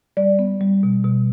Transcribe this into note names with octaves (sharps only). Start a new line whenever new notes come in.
G3 D5
B3
G3
B2
B2